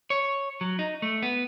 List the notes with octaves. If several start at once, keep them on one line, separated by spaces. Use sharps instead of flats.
C#5
F#3
D#4
A3
B3